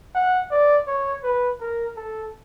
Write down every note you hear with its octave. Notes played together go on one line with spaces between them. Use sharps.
F#5
D5
C#5
B4
A#4
A4